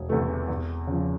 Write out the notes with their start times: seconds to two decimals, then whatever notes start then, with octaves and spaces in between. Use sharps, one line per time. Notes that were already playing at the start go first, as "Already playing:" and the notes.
Already playing: E1
0.09 E2 C3 E3 A3
0.48 E2
0.87 C#3 F3